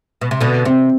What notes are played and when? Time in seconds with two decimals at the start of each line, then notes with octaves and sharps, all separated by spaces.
0.21 B2
0.31 C3
0.40 B2 D3
0.65 C3 C4